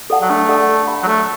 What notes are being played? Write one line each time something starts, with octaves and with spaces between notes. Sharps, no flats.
A4 D5 F#5 A5
F#3
A3 D4
A4 D5 F#5 A5
A4
F#5 B5
F#3
A3 A4